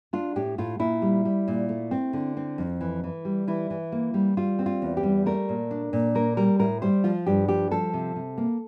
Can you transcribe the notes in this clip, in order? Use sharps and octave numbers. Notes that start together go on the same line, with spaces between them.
D4 F4
A2 G4
A2 F4
A#2 E4
G3
G3
A#2
A3
C4
D3
C4
F2
E3
E3
G3
E3 E4
E3
A#3
G3
G3 F4
C4
F4
E2
G4
G3
A3 A#4
A#2
D4
A#2
A#3 A#4
G3 A#4
A2 A#4
G3 C5
F3 F4
G2 G4
F3 G4
F3 A4
C3
C3
A#3